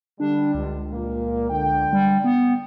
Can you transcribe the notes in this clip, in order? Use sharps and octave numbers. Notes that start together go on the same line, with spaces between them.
D3 G3 D4
C#2
A#2 A#3
D3 G5
G3
B3